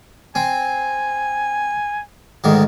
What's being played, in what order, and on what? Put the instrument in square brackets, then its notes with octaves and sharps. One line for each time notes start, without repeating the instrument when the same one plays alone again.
[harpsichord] C4 [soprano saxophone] G#5
[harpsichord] D2 G#2 D#3